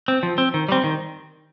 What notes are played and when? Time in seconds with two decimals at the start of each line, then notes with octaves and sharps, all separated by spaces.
0.08 C4
0.23 F3
0.38 C4
0.54 D#3
0.69 G3 C4
0.84 D#3